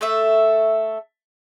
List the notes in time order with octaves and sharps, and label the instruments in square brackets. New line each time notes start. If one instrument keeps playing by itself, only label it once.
[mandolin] A3 A4 E5